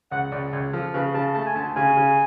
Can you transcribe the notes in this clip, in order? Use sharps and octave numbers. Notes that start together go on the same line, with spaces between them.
C#2 F#5
C#2 D5
C#2 C#5
F3 A4
C#3 B4
C#3 A5
A3 A5
G#5
D2 A5
C#3 G#5
C#3